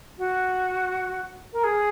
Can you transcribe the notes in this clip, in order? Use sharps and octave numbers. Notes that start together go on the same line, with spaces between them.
F#4
A#4
G#4